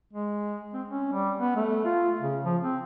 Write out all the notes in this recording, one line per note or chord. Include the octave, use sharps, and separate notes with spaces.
G#3
C4
C#4
G3
B3
A3
F4
C#3
F3
C4